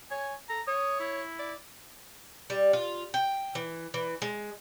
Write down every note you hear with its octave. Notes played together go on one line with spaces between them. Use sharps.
C#5 G#5
A4 A#5
C#5 D#6
E4
D5
G3
F4
G5
E3
E3
G#3